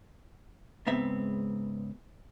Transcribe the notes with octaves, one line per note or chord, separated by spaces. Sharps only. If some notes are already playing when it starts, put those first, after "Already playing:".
C#2 G#2 B3 C4 E5